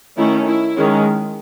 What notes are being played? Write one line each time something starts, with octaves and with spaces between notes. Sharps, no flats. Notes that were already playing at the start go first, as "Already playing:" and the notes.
D#3 A3 C#4 E4
E4
D#3 G#3 C#4